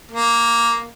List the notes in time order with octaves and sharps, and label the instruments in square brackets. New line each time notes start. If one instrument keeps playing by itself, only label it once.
[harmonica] A#3